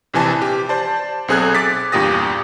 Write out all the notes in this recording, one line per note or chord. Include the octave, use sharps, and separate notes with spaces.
A#1 C3 E3 G#5 A5
G4
C5 D5 A5
B1 C4 G#4 A4 F#6 G#6
D6 A6 B6
E2 G2 A#2 G4 D#6 A#6